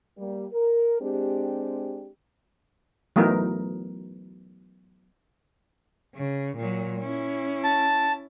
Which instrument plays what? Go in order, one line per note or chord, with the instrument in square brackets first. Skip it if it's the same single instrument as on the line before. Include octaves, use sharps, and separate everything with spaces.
[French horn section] G3 A#3
A#4
G#3 C4 D4 G4
[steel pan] E3 F#3 A3 B3 D#4 A#4
[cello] C#3
A#2 F#3
C#4 E4
[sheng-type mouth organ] A5